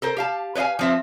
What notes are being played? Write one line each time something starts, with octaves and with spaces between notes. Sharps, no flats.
A4 A#4 C5
G4 F5 A5
B4 C#5 D#5 F5 G#5
F3 C4 E5